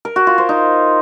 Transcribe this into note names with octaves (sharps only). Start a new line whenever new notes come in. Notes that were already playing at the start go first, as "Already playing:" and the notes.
A#4
F#4
F4
C5
D#4